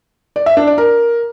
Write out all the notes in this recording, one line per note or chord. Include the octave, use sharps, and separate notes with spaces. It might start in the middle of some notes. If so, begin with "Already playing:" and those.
D5
E5
D4
D5
A#4